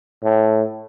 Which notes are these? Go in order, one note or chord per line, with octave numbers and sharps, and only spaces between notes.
A2